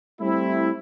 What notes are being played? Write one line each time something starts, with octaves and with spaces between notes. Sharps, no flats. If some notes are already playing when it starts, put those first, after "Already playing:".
G3 A3 C4 E4